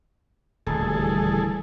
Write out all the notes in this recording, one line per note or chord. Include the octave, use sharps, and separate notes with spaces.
D#1 D2 E3 G3 G#4 A4